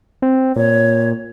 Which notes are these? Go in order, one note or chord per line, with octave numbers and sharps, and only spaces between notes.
C4
A#2 C#5